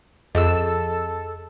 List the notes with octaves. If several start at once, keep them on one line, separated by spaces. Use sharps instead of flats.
F2 G#4 A4 D#5 E6